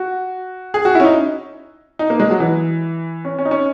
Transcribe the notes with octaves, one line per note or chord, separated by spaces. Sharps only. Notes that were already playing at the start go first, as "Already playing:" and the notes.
Already playing: F#4
G#4
F#4
C#4 E4
D#4
D#4
A#3
G#3
F#3
E3
C#4
C#4
D#4
C#4